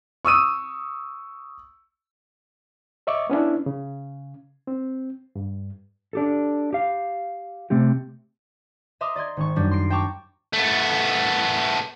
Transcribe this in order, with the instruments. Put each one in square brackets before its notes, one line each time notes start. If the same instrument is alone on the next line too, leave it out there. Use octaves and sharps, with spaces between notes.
[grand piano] C#6 D#6 E6 D#7
[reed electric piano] C#5 D#5 E5 C#6 D6
B3 C#4 D4 E4
C#3
C4
G2
[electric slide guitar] D4 G4 A4
G4 F5
C3 A3 C4 G4
[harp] D#5 E5 A#5 C6 D6 D#6
D5 D#5 C6 G#6
G#1 C#4 C#6
F#2 G3 D4
C6 A#6 C7 D7
G5 A5 A#5 C#6 D6
[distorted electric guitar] A3 B3